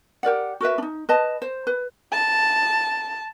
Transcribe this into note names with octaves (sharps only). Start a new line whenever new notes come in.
G4 A#4 D5 F#5
F#4 A#4 B4 E5
D4 D#4
B4 D#5 A5
C5
B4
A5